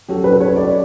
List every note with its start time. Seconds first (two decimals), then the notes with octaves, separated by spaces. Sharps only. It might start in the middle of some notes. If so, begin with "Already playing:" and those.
0.08 F#3 C#4 F#4 G4 A4
0.24 B4
0.40 C#5
0.56 D5